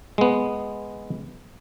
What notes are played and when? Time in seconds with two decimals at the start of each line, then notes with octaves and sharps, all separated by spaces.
0.18 G#3 B3